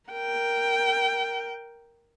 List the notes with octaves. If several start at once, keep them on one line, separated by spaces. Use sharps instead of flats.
A#4 G5